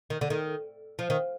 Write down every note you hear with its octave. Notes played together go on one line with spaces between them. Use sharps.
D#3
D3
D#3
F3
D#3